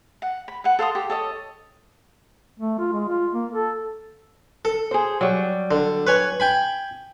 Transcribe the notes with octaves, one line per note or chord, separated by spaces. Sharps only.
F#5
B5
B4 F#5
A4 F5 C6 D#6
G4
A4 C#5 D#5
A3
F4
G#3
F4
A#3
A4
A4
G#4 C5
F#3 G3
D3
B4 C#5 G#5
G5 G#5 B5